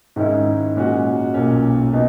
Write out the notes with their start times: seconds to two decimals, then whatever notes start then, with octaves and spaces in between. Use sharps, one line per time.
0.16 G#2 D#3 G#3 C#4 E4
0.75 A#2 G#3 C#4 F#4
1.34 B1 A#2 A#3 C#4
1.93 B2 D#4